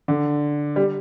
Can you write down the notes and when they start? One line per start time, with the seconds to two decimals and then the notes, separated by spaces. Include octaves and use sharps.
0.08 D3
0.76 G3